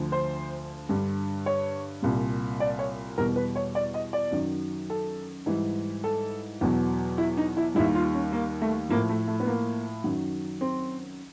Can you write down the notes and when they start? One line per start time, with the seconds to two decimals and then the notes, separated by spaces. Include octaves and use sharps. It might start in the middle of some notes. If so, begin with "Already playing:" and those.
Already playing: D2 D3 F3
0.12 C5
0.89 G2 D3 G3
1.46 C#5
2.02 C2 A#2 G3
2.60 D5
2.79 C#5
3.18 E2 B2 G3 A#4
3.36 B4
3.56 C#5
3.75 D5
3.94 D#5
4.13 D5
4.31 F#2 D#3 F#3
4.90 A4
5.46 G#2 E3 G3
6.04 A4
6.61 E2 B2 F#3
7.18 E4
7.37 D#4
7.57 E4
7.75 D#2 D#3 G3 E4
7.95 F4
8.14 C#4
8.33 A#3
8.62 A3
8.89 A2 F3 A#3
9.09 A3
9.28 A3
9.40 B3
9.47 A#3
10.04 F#2 D#3 F#3
10.61 C4